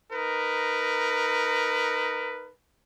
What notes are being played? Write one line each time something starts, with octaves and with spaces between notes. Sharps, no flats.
D#4 A#4 B4